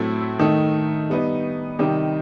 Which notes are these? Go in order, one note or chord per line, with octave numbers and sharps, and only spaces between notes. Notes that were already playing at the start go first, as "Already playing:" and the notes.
Already playing: A2 F#3 A3 C4 E4
D#3 A3 D#4
G3 B3 D#4
C3 D#3 G3 D#4 G4